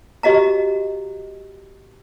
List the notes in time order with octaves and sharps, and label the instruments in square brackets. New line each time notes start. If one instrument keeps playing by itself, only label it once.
[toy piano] F#4 G4 D#5 F5 A#5